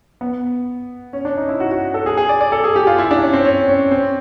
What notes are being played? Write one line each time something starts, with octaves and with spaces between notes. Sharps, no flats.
B3
C#4
D4
D#4
E4
F#4
F#4
A4
G#4
G#4
D5
D5
A4
G#4
G4
F4
E4
D4
C#4
C4
C#4
C#4
C4